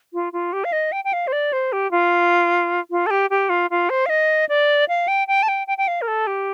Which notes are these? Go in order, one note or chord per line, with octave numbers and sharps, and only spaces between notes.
F4
F4
G4
F5
D#5
G5
G5
F5
C5
D5
C5
G4
F4
F4
A4
G4
G4
F4
F4
C5
F5
D#5
D5
F5
G5
G5
A5
G5
G5
G5
F5
A#4
A4
G4